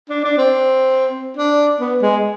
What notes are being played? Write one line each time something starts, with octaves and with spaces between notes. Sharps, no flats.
D4
D4
C4
D4
B3
G#3